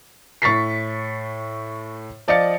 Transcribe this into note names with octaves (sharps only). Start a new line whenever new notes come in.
A2 C#6 A6 B6 C7
F3 D5 D#5 F5 A6 C#7